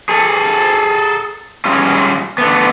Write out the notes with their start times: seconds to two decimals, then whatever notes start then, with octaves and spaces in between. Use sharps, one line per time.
0.09 G#4 A4
1.65 G3 G#3 C#4 F4
2.38 D3 A3 B3